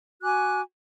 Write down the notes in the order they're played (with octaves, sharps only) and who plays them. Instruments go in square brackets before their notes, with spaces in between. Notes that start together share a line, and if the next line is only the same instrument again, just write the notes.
[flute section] F#4 G#5 D6 F#6